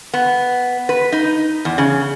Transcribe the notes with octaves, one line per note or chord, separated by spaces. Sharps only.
B3
B4
D#4
E2
C#3